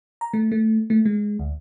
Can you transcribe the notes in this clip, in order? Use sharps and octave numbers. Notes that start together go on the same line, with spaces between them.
A#5
A3
A3
A3
G#3
D2